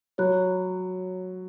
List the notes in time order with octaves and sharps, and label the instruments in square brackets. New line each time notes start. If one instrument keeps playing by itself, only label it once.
[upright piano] F#3 [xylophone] C#5 B5 F#6